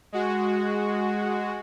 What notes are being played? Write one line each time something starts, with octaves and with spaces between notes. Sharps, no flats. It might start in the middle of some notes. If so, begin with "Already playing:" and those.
G#3 F#4